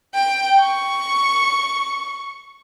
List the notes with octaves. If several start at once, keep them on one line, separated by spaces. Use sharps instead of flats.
G5
C#6